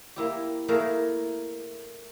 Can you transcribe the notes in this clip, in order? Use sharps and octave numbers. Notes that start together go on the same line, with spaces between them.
A#3 E4 G4
A3 A#3 E4 G#4 A#4